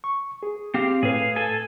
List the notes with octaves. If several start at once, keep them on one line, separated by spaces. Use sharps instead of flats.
C#6
G#4
C4 G4 F5
A2 G#4 B4 F5
A4 G#5